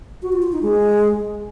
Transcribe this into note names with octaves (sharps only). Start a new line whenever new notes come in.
F#4
F4
F4
D#4
G#3